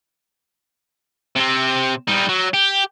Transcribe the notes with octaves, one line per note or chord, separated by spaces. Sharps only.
C3 C4
G3 D#4
F#3
G4